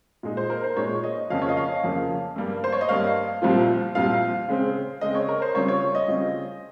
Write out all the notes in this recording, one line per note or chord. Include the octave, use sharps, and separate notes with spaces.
A#2 G#3 D#4
C5
A#4
C5
A#2 G#3 D#4 C#5
D#5
F2 C#3 F3 A#3 F5
C#5
D#5
F5
F2 C#3 F3 A#3
G2 G3 A#3
C5
C#5
D#5
G2 G3 A#3 F5
C2 A#2 F3 C4 F4
C2 A#2 F3 C4 F4 F5
C#3 G#3 C4
C#3 G#3 C4 D#5
C#5
A#4
C5
C#3 G3 C4 F4 C#5
C#5
D#5
C#3 G3 C4 F4